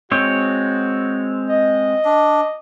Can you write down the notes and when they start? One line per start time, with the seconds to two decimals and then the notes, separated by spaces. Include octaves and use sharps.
0.11 G#3 C4 F#4 C#5
1.50 D#5
2.05 D4